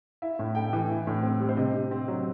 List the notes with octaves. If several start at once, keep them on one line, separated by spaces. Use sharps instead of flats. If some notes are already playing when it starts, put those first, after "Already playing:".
E4 E5
A2
A3 G5
E3
E4
A2
C4
G3
C5
C3 D#5
C3
C4
F#3